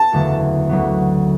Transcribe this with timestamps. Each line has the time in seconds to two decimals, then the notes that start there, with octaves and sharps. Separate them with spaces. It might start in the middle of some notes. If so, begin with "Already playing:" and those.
Already playing: B3 A5
0.12 F#1 E2 D3 A3 F#4
0.69 D2 D3 F#3 B3